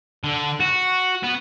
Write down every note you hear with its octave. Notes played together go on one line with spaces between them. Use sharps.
D3
F#4
B3